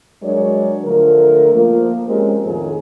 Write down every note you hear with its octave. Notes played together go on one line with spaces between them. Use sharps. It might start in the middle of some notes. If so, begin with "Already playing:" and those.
F#3 G#3 D4 A#4 C#5 D5
D3 F3 A3 A#4
F3 A#3
G#3 C4 C#4 G4 A#4
F2 A2 D#3 F3 G#4